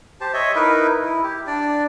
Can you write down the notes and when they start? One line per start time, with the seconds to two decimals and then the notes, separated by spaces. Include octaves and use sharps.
0.21 G4 C5 A5
0.34 C#5 D#5 E5
0.55 D#4 E4 A#4 B4
1.05 E4
1.23 G4
1.47 D4 D5